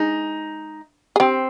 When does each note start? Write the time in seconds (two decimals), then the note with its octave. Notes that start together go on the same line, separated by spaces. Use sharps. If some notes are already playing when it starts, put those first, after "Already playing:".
Already playing: G#3 D#4
1.16 G#4
1.20 C4 G4